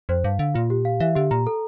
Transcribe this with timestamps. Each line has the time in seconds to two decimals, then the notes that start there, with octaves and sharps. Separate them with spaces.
0.09 F2 C5
0.24 G2 F5
0.39 D3 F5
0.54 A#2 F4
0.70 G4
0.85 F5
1.00 E3 E5
1.15 D3 G4
1.31 A#2 A#5
1.47 A4